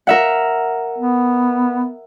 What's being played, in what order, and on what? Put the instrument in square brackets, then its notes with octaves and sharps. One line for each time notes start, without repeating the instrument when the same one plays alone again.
[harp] A#4 E5 F#5
[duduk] B3